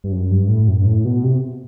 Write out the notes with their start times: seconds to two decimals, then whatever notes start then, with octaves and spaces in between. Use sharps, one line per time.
0.04 G2
0.12 F#2
0.31 G2
0.49 A2
0.68 F#2
0.80 G2
0.86 A2
1.05 B2
1.24 C3